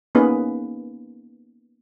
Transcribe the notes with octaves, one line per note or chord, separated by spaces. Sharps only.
A#3 B3 C#4 D#4 G#4 B4